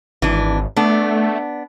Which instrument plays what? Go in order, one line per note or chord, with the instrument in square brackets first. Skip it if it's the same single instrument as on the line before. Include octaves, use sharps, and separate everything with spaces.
[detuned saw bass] G#1 [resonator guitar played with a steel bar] E3 D4
[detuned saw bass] A3 [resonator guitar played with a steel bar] B3 D4